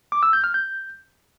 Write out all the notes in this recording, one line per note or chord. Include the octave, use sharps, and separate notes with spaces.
D6
E6
G6
F6
G6